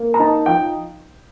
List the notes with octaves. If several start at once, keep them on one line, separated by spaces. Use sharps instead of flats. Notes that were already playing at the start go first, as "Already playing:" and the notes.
Already playing: A#3
A#5
D#4 A5
F3 G5